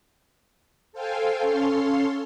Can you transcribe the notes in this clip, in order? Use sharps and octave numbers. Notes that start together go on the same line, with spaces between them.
A4 C5 F5 G5 G#5
C#4 A4 C#5 F5 C6